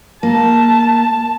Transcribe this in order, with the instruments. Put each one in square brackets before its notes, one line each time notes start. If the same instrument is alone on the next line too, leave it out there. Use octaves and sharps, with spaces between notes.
[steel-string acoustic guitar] A#3 [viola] A5